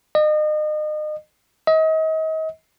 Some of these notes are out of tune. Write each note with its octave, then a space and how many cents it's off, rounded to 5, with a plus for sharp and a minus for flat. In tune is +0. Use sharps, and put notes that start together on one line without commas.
D#5 -35
D#5 +35